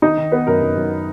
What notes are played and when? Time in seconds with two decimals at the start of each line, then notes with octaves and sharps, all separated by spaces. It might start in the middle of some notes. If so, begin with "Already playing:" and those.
0.02 D#3 D#4 D#5
0.17 D#3
0.32 B3 B4
0.47 F#2 A#4
0.62 F#2
0.76 F#2